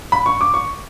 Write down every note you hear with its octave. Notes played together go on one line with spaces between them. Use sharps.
B5
C#6
D6
C#6